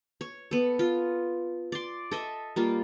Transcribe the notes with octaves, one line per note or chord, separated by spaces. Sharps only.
C#5
B3 A4
F4
D5 C6
A4 D#5 E5
G3 A#3 F4